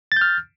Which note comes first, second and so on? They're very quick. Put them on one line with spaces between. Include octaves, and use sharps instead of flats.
A6 G6 F6